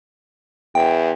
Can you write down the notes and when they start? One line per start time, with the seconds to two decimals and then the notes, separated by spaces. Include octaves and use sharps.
0.75 E2 G5